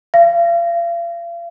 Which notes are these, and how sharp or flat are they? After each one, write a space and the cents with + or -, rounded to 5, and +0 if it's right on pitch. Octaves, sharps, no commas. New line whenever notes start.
F5 -40